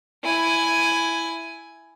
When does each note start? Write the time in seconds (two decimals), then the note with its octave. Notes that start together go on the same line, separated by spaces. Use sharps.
0.24 E4 G#5